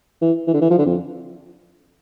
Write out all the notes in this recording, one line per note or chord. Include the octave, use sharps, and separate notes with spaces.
E3
E3
D3
E3
F3
D3
F2